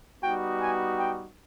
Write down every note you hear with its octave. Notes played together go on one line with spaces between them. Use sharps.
G3 B3 D#4 F#4 G5
G#5
G5